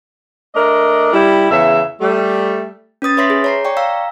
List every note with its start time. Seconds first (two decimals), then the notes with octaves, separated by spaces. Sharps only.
0.55 A3 D4 A#4 D#5
1.13 G3 E4
1.51 E2 C#3 E5
2.01 G3 A3
3.02 C#4 B4 D#6 A6
3.17 B4 C#5 E5 C6 A#6 B6
3.30 G#4
3.44 C#5 A#5 C7
3.65 D5 G5 C#6
3.77 F5 A#5 E6